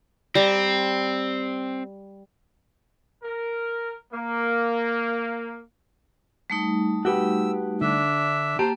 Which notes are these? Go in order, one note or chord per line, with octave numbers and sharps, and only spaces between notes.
G3 C4 A#5
A#4
A#3
G3 A3 D#4
F#4 G4 B4 E6
D3 D4 E5
A#3 G4 C5 A5 A#5